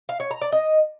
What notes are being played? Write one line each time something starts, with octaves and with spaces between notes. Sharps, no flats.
F5
C#5
A#5
D5
D#5